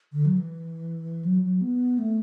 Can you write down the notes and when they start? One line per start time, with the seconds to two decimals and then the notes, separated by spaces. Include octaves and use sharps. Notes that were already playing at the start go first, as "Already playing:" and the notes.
0.13 D3
0.25 F#3
0.38 E3
1.25 F#3
1.42 F#3
1.61 B3
1.98 A3